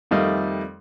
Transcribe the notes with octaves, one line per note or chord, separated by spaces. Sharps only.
F2 D#3 G3 A3 D#5 F5